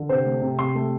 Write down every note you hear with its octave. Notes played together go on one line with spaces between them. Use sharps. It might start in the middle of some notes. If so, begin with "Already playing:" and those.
Already playing: D3
C3 C5
A3
C3
C3 C6
A3